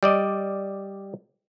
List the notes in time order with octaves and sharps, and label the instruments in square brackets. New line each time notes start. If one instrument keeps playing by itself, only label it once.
[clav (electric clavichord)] G3 D5 D#5